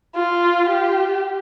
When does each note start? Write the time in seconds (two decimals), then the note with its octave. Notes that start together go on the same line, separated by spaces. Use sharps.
0.15 F4
0.69 G4